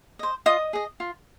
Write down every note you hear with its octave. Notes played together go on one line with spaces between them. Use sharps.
C5 D#5
F4 D#5 D#6
G#4 D#5
F4